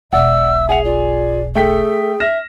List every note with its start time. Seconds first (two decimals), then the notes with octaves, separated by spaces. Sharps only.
0.13 E1 B1 D5 E5 F#5 E6
0.69 G#4 F#5 G#5 F7
0.85 F4 D5
1.55 A3 G#4 A4 G5 B6
2.20 E5 F6 A#6 E7